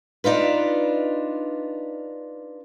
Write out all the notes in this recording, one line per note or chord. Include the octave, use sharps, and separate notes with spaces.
D4 D#4 F4 B4